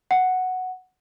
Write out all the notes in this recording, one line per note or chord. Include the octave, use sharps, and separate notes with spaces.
F#5